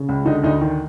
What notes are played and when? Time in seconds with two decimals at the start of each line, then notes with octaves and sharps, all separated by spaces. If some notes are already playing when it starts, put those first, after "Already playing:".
Already playing: C#3
0.09 C#2
0.25 D3 D#4
0.43 D2 D#4
0.61 D#3